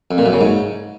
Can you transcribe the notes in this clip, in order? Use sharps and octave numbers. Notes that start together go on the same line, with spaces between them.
F2
A#2
F#2
C#3
G#2